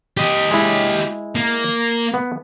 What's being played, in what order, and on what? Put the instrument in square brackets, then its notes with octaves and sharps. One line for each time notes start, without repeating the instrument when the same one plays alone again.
[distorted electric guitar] G4 D#5
[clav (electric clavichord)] G#3 E4
[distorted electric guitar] A#3
[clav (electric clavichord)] B3